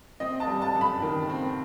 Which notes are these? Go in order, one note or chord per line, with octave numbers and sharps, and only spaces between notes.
C4 D#5
A5
G3
A5
F#2
B5
D#3
C4